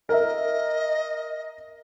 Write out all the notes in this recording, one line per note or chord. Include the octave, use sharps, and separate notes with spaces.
A#4 D#5 E5